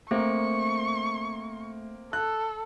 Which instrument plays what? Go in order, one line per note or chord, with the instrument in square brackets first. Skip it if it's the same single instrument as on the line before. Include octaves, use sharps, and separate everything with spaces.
[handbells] A3 [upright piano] A#3 C4 [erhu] C#6
[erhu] A4 [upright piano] F#6